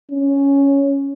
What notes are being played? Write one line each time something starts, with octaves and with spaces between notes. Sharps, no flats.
C#4